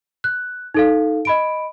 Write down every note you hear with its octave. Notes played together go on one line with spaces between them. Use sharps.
F#6
D#4 A4 F5
D#5 B5 D7